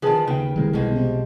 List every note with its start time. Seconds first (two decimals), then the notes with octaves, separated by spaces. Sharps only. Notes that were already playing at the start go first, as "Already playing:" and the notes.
0.02 D#3 F3 G#4 B4 A5
0.27 D#2 C#3 B4 G5
0.56 C2 D#3 G#3
0.73 B1 B2 F3 G#3
0.95 C3